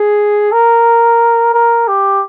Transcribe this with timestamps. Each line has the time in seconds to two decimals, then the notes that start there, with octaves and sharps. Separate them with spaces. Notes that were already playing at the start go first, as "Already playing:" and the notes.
Already playing: G#4
0.52 A#4
1.54 A#4
1.88 G4